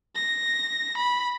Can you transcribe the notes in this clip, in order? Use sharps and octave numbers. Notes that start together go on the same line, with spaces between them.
A#6
B5